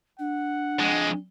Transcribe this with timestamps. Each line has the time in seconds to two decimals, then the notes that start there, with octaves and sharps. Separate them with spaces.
0.19 D4 F#5
0.79 F2 G#3